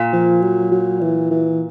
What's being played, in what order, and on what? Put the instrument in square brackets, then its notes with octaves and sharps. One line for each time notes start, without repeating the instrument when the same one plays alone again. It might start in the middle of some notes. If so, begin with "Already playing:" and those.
Already playing: [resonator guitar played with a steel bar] A#2
[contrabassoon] F3
F#3
F#3
E3
E3